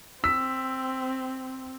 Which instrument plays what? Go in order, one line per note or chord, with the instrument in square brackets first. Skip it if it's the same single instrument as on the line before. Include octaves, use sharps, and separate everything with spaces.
[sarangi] C4 [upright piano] E6 B6